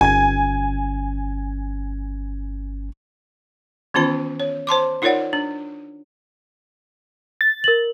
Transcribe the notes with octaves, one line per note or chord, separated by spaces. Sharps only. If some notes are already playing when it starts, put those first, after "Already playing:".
G1 C#4 G#5 G#6
D#3 E3 B3 C#4 F4 B5
C#5
C5 A5 C6 D6
D#4 F4 A#4 C#5 D5 F#5
D4
A6
A#4 F#7